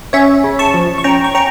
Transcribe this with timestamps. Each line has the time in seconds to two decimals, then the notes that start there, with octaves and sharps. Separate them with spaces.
0.13 C#4 C#5 E5
0.44 C#3
0.59 A5 C#6
0.74 F3
0.98 C#6
1.04 C#4 G5 A#5
1.24 C#6
1.35 C#4 G5 A#5